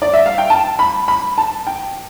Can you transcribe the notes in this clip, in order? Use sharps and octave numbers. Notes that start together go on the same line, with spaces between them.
D5
E5
F5
G5
A5
B5
B5
A5
G5